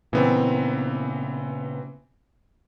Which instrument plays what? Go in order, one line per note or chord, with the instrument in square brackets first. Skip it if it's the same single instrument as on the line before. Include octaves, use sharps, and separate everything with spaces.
[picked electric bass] A#2 C#3 [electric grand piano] E3 B3 C4